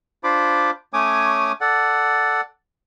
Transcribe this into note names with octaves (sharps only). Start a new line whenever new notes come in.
D4 F4 C5 B5 D6
A3 C#4 C#5 G#5 D6 D#6
A4 D5 F#5